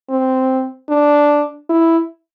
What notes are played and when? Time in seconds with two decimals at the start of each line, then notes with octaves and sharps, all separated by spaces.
0.10 C4
0.90 D4
1.70 E4